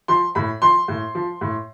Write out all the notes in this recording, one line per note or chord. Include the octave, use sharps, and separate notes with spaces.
F3 C6
A2 B5
F3 C6
A2
F3
A2